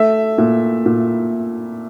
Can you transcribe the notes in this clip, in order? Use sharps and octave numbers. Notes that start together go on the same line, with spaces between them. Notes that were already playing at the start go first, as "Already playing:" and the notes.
Already playing: A3 E5
A#2
A#2